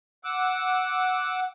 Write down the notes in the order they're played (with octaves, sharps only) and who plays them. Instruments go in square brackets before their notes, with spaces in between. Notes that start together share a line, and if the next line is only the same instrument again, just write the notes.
[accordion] F#5 D6 E6